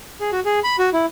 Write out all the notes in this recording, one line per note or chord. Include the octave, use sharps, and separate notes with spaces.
G#4
F#4
G#4
B5
F#4
E4